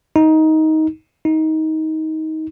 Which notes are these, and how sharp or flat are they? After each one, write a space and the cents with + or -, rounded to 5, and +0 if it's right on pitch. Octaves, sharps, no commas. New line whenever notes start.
D#4 +15
D#4 +20